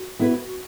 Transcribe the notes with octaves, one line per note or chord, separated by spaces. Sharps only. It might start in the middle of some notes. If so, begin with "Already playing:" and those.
Already playing: F#4
B3 E4 B4